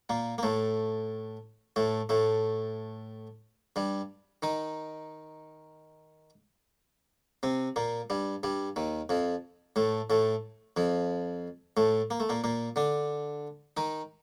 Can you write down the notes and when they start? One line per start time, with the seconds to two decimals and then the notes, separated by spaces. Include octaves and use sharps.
0.09 A#2 A#3
0.38 A#3
0.43 A2 A3
1.76 A2 A3
2.09 A2 A3
3.76 G2 G3
4.43 D#3 D#4
7.43 C3 C4
7.76 A#2 A#3
8.10 G2 G3
8.43 G2 G3
8.76 D#2 D#3
9.09 F2 F3
9.76 A2 A3
10.10 A2 A3
10.77 F2 F3
11.77 A2 A3
12.11 A#3
12.20 A3
12.29 A#2 A#3
12.44 A#2 A#3
12.76 D3 D4
13.77 D#3 D#4